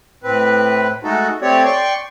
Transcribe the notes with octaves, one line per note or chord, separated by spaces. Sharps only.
A2 C4 B4
G#3 A3 D#4 F#4 A4
A3 C4 G4 C#5 D5
D5 G5 C6 C#6